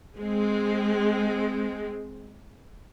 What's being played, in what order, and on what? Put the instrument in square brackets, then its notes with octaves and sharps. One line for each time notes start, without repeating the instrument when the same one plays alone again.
[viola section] G#3 C4